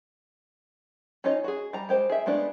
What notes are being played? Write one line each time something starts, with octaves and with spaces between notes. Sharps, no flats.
C#4 D#4 F4 C#5 D#5
F#4 G#4
G3 A#5
G#3 G4 C5
G#4 E5
G#3 A3 B3 D4 F4